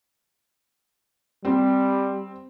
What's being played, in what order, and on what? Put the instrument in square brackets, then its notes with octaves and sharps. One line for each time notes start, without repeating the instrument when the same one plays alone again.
[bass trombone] G3 [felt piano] C4